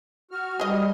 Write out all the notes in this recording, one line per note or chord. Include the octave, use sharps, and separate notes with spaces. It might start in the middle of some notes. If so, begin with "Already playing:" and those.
F#4 F6
G3 G#4 D#5